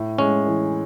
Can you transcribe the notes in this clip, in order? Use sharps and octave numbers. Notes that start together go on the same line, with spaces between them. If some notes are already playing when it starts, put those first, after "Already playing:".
Already playing: A2
G#3 C#4
E3